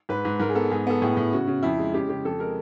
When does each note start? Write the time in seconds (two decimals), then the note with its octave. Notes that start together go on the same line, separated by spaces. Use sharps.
0.09 G#2 B4
0.25 G#2
0.40 G#2 A#4
0.49 G#4
0.55 B3 A4
0.72 G#2 G#4
0.87 B3 A4
1.02 A2 G#4
1.17 A2
1.33 C#3 F#4
1.47 C#3
1.63 F2 E4
1.79 G#3
1.94 C#3 G4
2.09 C#3 G4
2.25 F2 A4
2.39 G#3 A#4